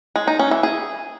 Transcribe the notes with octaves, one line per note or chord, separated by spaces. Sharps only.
G#3
D#4
C#4
E3
G#4